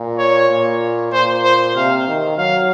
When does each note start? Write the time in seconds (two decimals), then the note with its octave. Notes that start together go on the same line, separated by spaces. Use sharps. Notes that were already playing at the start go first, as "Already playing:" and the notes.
Already playing: A#2
0.19 C#5
0.50 A#2
1.12 A#2 C5
1.44 C5
1.75 C3 F5
2.07 D#3
2.38 F#3 F5